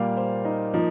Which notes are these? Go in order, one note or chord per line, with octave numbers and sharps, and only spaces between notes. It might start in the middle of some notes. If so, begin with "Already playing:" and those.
Already playing: A#2 G3 A#3 F5
C5
D#4
F3 A#3 D#4